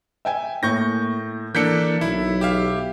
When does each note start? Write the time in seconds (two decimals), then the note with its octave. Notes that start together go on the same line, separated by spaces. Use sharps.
0.25 E5 G5 G#5
0.63 A2 A#3 C#6 G6 A#6
1.55 E3 A#3 D4 A4 G6 B6 C#7
2.01 B1 E4
2.41 G4 E5 F5